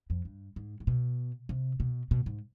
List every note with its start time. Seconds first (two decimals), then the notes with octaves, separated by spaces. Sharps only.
0.10 F2
0.25 G2
0.56 G#2
0.80 G#2
0.87 B2
1.49 C3
1.80 B2
2.11 B2
2.26 G#2